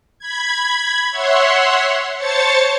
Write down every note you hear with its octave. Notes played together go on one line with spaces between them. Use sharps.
B5 G#6
C#5 E5 F#5 C6
C5 C#5 A5 A6 C#7